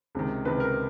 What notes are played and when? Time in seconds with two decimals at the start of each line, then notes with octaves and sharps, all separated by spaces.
0.15 C#2 C3 D#3
0.45 C#2 C3 D#3 B4
0.60 A#4